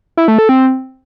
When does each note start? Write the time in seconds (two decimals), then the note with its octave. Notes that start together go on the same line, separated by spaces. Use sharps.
0.17 E4
0.28 A3
0.39 A4
0.49 C4